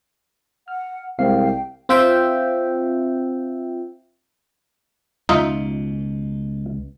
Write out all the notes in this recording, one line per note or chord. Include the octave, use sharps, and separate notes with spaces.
F#5 F6
C2 G#3 C4 F5 G5 C7
C4 F4 E5 G5
C#2 B2 D#4 F4 E5